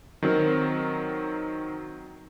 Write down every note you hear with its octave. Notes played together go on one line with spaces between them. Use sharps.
D#3 F#3 C4 A#4